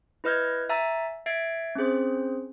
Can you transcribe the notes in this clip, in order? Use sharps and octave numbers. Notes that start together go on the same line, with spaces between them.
E4 B4 D#5 F6 G6 G#6
E5 G#5 A#5 E6 A6
E5 G#6 A6 C7 D7
C4 C#4 G#4 C5